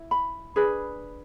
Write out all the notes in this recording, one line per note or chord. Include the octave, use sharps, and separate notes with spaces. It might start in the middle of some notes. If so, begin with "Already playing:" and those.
Already playing: E4
B5
D4 G#4 B4